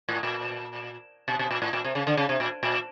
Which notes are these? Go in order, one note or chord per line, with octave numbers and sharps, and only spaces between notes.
A2
A#2
B2
B2
A#2
A2
A#2
C3
C#3
D3
C#3
C3
A#2
A#2